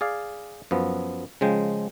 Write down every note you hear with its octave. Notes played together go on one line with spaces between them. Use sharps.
G#4 D5 F5
F#2 F3 B3
C#3 F3 G#3 G5